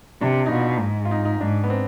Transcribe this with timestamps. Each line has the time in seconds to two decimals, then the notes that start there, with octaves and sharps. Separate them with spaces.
0.21 C3 D4
0.46 D#4
0.52 B2 F4
0.80 G#2
1.05 F4
1.11 D#4
1.25 D#4
1.40 G#2 D4
1.64 B3
1.70 C4